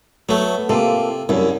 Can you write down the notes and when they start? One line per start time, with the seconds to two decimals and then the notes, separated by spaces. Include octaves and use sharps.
0.29 F#3 A3 B3
0.69 C3 A#3 F4 A4
1.29 C2 F#2 E4